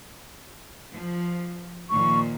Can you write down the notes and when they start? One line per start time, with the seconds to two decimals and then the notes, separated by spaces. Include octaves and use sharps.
0.92 F3
1.90 A#2 D#3 F3 C#6